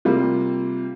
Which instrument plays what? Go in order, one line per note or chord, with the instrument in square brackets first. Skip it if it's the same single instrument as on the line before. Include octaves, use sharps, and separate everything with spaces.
[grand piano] C3 G3 A#3 F4